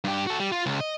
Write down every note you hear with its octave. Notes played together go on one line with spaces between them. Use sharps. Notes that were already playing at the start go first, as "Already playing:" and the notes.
G2 G4
F#4 A4
G3
F4
C#2
D#5